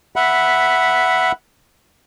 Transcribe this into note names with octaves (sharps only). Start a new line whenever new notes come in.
E5 F#5 B5